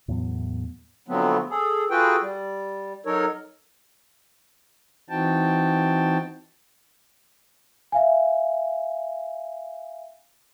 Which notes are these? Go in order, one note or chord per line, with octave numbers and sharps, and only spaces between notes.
E2 A2 F#3 B3
D3 F3 F#3 A3 B3 C4
G#4 A4
F4 F#4 G#4 A4 B4 G5
G3
F#3 D#4 A4 A#4 C#5
E3 C4 D#4 F#4 G5 A5
E5 F5 G#5